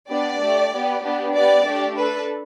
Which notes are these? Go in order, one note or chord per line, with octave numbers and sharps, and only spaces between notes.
B3 D4 G4 D5
A3 G4
B3 G4
B3 D4 G4
B3 G4 D5
A3 D4 G4
D4 A4 B4